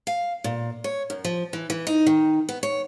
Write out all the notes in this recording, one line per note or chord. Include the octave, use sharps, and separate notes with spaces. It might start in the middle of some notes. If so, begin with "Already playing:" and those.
F5
A#2
C#5
F#2
F3
E3
E3
D#4
D#3
B3
C#5